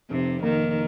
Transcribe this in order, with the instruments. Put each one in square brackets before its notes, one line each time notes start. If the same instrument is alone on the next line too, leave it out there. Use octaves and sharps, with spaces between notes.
[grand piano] F1 [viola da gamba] C3
[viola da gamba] D#3 [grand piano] A#3